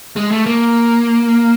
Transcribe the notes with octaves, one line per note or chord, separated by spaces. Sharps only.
G#3
A3
A#3